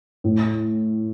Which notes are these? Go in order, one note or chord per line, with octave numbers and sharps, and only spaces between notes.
A2